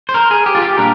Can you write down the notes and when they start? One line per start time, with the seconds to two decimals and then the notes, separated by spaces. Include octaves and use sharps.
0.09 C5
0.14 A#4
0.31 G#4
0.46 G4
0.55 F4
0.62 G4
0.78 A#2 G3 D4 A#4